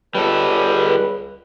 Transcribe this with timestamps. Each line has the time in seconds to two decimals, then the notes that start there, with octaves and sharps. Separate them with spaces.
0.15 C#2 G3 A4 B4